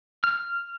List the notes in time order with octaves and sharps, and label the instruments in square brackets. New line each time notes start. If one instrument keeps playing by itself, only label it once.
[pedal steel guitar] F6